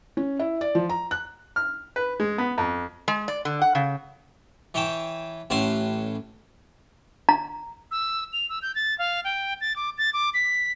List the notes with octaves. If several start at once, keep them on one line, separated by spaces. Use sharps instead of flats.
C#4
E4
D5
F3
A#5
F#6
F6
B4
G#3
B3
F2
G#3
D5
D3
F#5
C#3
E3 C#5 G5 A5
A1 A2 C#5 F#5 A5 C6
A#5
E6
F7
E6
G6
A6
F5
G5
A6
D6
A6
D6
B6